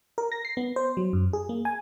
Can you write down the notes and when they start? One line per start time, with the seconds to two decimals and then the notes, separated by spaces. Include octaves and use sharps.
0.18 A#4
0.32 A#6
0.45 C7
0.57 B3
0.76 C5
0.97 F#3
1.13 F#2
1.33 G#4
1.49 A#3
1.65 G#5